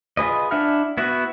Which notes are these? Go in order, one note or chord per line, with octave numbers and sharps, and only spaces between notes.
F4 G#4 B4 D#5
D4 E4 E5 F#5 F6
B3 E4 F#4